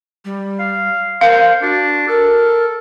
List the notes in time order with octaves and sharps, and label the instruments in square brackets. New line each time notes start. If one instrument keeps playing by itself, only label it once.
[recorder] G3
[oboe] F5
[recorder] A#4 [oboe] C5 [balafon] F5
[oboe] D4 [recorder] F#4
[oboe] A4 [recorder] A#4